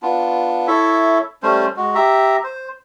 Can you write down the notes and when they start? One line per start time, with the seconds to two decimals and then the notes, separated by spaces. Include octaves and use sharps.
0.02 B3 D4 F4
0.67 E4 A4 C#5 E5
1.43 G3 A3 C#4 C5
1.77 G#3 F#4
1.95 G4 E5 A#5
2.44 C5